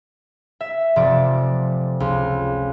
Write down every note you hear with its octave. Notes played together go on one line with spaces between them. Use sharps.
E5
F1 F3 D5
C#2